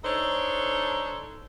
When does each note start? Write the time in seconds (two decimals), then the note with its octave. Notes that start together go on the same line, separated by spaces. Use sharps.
0.04 D4 D#4 A4 C5 C#5